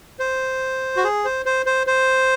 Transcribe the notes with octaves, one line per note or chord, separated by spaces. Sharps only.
C5
F#4
G#4
C5
C5
C5
C5